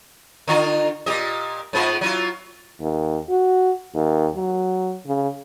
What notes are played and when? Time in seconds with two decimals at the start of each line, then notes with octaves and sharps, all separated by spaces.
0.48 D3 D#4 F4
1.06 A#2 G4 D#5
1.73 G#2 B3 F4
2.01 F#3 E4 F4
2.80 D#2
3.30 F#4
3.95 D#2
4.36 F#3
5.07 C#3